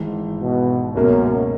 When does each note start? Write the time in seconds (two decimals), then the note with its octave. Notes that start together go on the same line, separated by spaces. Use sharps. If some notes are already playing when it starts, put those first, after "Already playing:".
Already playing: G#1 G#2 E3
0.40 B2
0.94 C#2 F#2 B2 A#3 C#4